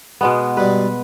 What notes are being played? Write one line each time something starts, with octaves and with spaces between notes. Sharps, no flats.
B2 G#3 B3
G2 B2 G3 B4